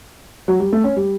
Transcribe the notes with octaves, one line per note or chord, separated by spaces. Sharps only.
F#3
G3
A3
C#4
G3